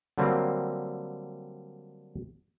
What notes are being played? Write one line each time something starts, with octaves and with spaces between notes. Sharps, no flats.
D3 F#3 G3 A#3 C4